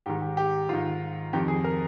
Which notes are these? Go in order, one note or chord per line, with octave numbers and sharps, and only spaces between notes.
G#2 D#3 G4
G4
G4
G#2 D#3 F4
F2 D#3 G4
G#4
A#4